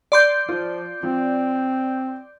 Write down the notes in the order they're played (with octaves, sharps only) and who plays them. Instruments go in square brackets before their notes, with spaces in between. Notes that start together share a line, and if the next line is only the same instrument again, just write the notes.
[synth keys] D5 C6 G6
[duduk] F3 [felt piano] F4
[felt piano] F3 [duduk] C4